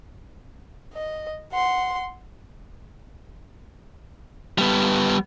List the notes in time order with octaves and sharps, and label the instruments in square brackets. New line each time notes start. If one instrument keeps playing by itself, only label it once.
[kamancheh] D#5
F#5 C6
[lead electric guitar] G3 B3